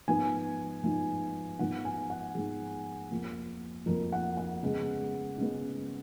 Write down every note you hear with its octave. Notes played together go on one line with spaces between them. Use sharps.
G#2 F3 B3 G#5
G#2 F3 B3
G#2 F3 B3 F#5
G#5
F#5
G#2 F3 B3 G#4
F2 F3 A#3
F2 F3 A#3 A#4
F#5
F#5
C#3 G#3 B3
C#3 G#3 B3